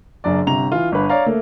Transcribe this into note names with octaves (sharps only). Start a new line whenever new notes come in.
F#1 F#2 D4 D5
G1 C3 A#5 F7
E3 F4
G1 B4
C#5 D5 F5 A#5
A3 A#3